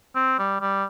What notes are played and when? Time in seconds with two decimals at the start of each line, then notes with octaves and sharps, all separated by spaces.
0.15 C4
0.39 G3
0.61 G3